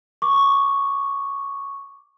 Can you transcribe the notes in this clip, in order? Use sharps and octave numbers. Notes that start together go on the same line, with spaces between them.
C#6 D6